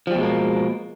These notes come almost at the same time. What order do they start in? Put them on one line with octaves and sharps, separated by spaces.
F3 G3 B2 G#3 A#3